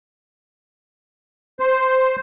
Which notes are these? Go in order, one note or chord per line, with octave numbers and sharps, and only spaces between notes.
C5